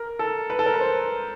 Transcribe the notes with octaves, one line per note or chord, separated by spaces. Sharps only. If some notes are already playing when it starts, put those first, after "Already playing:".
Already playing: A#4
A4
B4
A4
A#4
B4
C5